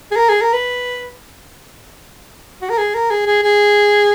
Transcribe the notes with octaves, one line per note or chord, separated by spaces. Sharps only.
G#4
A#4
G#4
A#4
B4
F#4
A#4
G#4
A#4
G#4
G#4
G#4